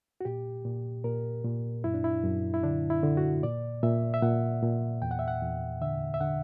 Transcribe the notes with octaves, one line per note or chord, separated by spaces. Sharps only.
F#4
A#2 G4
A#2
A#2 A#4
A#2
F#2 E4
D4
E4
F#2
E4
D3 D4
E4
D3
F#4
A#2 D5
A#2 E5
E5
A#2 F#5
A#2
E2 G5
F#5
E5
F#5
E2
D3 E5
E5
D3 F#5